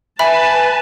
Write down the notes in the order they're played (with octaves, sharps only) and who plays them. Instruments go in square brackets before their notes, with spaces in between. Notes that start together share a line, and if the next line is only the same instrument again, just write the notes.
[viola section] B4 A5 [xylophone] E5 B5 [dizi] G#5